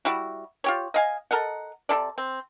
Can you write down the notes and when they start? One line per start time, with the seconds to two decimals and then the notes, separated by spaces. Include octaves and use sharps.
0.05 G3 E4 F#4
0.64 F4 G4 C#5
0.94 D#5 F5 G#5
1.31 A4 A#4 D#5 F#5
1.89 C3 E4 A4 D5
2.18 C4